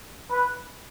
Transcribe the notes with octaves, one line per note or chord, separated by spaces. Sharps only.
B4